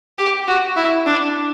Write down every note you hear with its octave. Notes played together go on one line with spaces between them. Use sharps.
G4
F#4
E4
D4